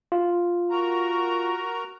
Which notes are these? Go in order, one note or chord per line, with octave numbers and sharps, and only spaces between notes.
F4
F#4 A#4 A#5